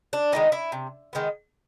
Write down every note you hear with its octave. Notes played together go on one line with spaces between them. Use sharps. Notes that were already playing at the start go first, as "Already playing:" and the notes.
D4
D#3 G#3 B3 D#4
E4
C3
D#3 G#3 B3